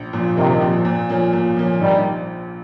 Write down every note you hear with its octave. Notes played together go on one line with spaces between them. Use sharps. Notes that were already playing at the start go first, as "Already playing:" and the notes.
Already playing: A#1
A#2 F3
A#1 C3 D#3
A#2 F3
A#2
F3 A#3 C#4
A#2
F3 A#3 C#4
A#1 D#3 G3